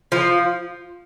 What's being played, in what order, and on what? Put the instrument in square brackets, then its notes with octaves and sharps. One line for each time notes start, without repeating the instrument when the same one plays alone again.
[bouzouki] F3